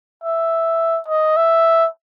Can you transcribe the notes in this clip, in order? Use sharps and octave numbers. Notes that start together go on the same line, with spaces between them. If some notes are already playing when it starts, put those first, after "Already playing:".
E5
D#5
E5